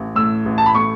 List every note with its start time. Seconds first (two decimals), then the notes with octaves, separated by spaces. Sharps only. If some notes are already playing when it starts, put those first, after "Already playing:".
Already playing: A1
0.16 A2 E6
0.46 A1
0.58 A5
0.66 B5
0.75 A3 C#6